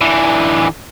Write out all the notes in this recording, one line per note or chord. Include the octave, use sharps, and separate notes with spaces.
D3 E3